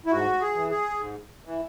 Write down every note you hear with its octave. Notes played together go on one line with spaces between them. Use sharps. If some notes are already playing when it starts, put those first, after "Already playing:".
E4
G#2 F#4
G#4
E3
G#4
G#2
E3